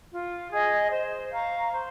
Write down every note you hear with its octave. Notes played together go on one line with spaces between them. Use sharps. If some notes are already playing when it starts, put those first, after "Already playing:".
F4
G#4 D#5
C5
F5 A#5 C#6
C5